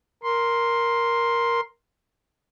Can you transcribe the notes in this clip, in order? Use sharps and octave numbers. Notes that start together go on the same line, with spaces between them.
A#4 C6